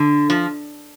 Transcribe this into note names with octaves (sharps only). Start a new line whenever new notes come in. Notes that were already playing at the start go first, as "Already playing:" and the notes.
Already playing: D3
F3